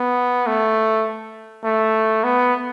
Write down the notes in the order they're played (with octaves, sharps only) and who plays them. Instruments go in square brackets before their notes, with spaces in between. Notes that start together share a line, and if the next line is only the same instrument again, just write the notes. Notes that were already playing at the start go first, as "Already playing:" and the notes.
Already playing: [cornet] B3
A3
A3
B3